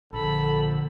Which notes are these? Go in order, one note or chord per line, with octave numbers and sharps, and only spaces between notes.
A#1 D3 A4 B5